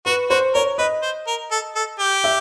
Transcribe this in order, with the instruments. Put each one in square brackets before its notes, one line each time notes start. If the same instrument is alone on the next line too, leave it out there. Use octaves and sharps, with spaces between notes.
[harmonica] F#4 [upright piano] B4
[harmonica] F#4 [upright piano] C5
[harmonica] A#4 [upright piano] C#5
[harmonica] B4 [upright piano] D#5
[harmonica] C5
A#4
A4
A4
G4
[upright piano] E5